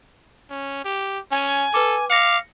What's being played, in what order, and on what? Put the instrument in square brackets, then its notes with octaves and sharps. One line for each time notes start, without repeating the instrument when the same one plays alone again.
[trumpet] C#4
G4
[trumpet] C#4 [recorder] G#5
[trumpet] A4 [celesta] B4 D6
[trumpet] F5 [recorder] D6 [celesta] A#6 C#7